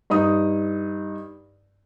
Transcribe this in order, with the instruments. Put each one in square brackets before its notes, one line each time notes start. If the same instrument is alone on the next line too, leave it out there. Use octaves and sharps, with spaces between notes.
[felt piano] G2 D#4 D#6